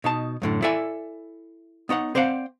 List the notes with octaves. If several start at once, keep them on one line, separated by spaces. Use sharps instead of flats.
B2 D#4 A5
F#2 A2 D3
E4 A4 D5 E5 G#5
B3 D#4 C#5 F#5
C4 C5 D5 F5 F#5